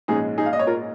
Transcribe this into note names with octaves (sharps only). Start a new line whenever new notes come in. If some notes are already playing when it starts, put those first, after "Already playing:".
A#1 G#2 G#3 C#4 D#4 G#4
D#4 G#4
F5
D#5
C#5
F4 A#4